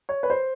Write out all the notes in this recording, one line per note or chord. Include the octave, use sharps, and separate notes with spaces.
C#5
B4
C5